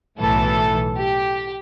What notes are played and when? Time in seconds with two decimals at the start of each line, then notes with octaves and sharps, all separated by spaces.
0.19 B1 A2 E3 A4
0.97 G4